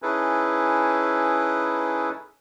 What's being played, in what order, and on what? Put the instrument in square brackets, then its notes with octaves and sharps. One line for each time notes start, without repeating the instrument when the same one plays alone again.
[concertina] C#4 D#4 E4 G#4 A4 B4